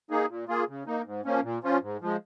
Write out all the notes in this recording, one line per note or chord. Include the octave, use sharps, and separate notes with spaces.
A#3 D#4 G#4
A#2
A#3 F4 G#4
C#3
A#3 D#4
G#2
F3 A#3 C#4
A#2
F3 C#4 F4
G#2
F3 G#3